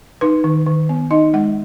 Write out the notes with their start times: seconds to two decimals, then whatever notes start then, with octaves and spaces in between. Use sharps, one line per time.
0.21 D#4 B4
0.44 D#3
0.66 D#3
0.89 B3
1.11 D#4 D#5
1.34 G#3 F#5